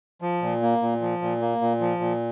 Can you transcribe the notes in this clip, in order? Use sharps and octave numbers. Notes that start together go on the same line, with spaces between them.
F3
A#2
A#3
A#2
F3
A#2
A#3
A#2
F3
A#2